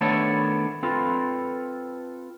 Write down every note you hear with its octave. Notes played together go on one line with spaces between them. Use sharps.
D#3 A3 B3 D4 A4 C#5
C4 F4 A4 B4